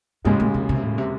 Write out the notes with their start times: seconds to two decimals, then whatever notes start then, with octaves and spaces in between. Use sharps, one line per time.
0.25 E1 D#2 G#2 C#3 G#3
0.40 A2
0.54 C3
0.69 C3
0.83 A2
0.98 C3